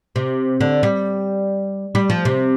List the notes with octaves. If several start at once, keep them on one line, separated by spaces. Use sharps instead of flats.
C3
D3
G3
G3
F3
C3